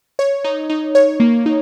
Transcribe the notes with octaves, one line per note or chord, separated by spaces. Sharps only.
C#5
D#4
D#4
C#5
A#3
D#4